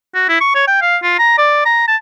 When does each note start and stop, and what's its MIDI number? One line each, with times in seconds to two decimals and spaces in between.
0.15 0.27 66
0.29 0.40 64
0.41 0.50 85
0.55 0.64 73
0.68 0.80 79
0.82 0.97 77
1.03 1.16 65
1.19 1.34 82
1.38 1.62 74
1.66 1.84 82
1.88 1.96 81